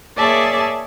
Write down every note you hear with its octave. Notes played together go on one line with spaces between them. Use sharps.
A#3 G#4 C#5 D5 E5 A5